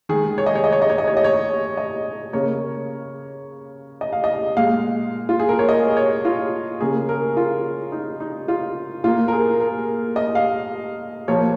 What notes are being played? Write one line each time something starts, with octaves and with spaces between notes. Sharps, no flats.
D#3 G#3 G#4
C#5
D#5
C#5
D#5
C#5
D#5
C#5
D#5
C#5
D#5
C#5
D#5
C#3 A#3 C#5
D#5
F5
D#5
A#2 G#3 F5
F4
G#4
A#4
C#5
D#5
C#5
F4
C#3 A#3 G#4
A#4
F4
D#4
D#4
F4
A#2 A#3 F4
A#4
G#4
A#4
D#5
F5
A#2 F3 A#3 C#5